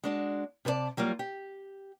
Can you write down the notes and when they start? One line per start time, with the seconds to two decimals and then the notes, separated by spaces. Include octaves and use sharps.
0.04 G#3 D4 F#4
0.65 C3 A4 B4 D5 A5
0.97 F#3 G3 A#3 F4
1.19 G4